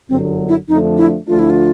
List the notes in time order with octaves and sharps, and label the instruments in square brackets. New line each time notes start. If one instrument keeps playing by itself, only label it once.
[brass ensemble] G1 F#2 D3 F#3 [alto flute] C4
[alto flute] E4
[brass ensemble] F2 D3 F3 A3 D4 [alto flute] D#4
[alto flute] E4
[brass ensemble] D2 D3 F3 A3 D4 [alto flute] F4
[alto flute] E4
F4